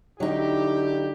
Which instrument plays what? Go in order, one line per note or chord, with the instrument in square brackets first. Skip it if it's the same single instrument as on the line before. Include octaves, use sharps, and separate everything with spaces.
[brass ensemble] D3 E4 G4 [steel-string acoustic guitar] F#3 D#4